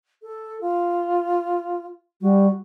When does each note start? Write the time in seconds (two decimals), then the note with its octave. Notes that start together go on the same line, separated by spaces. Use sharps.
0.22 A4
0.61 F4
2.21 G3 F#4